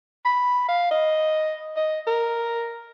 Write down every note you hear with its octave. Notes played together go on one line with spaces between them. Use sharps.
B5
F5
D#5
D#5
A#4